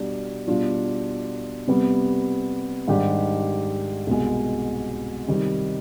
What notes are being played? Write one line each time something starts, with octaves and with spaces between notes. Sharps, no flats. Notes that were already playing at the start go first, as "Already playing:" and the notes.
Already playing: B2 G3 D4
B2 G3 D4 F4
C3 G3 B3
G#2 D#3 G3 D4 G4
C2 B2 G#3
C3 D#3 G3 C4 D#4